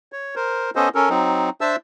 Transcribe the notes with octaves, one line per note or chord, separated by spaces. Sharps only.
C#5
A#4 C5
B3 C#4 A4 C5 D#5
C#4 A4 A#4
F#3 C4 D#4
D4 C5 E5 A5 E6